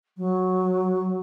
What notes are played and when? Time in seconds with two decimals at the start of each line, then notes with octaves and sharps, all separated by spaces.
0.17 F#3